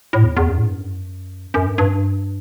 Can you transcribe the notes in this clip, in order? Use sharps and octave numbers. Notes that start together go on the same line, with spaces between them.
A2
E2
E2
F#2
A2
G2
F#2
F#2
G2
G2